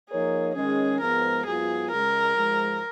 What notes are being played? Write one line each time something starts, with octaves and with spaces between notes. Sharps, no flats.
F3 A#3 D#4 G#4 A#4 C#5
D#3 G#3 C#4 G#4
G#2 F3 G#3 B3 A#4
G#2 F#3 B3 F4 G#4
C#2 C#3 G#3 A#4
G#2 F3 G#3